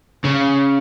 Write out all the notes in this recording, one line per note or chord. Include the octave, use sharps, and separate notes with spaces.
C#3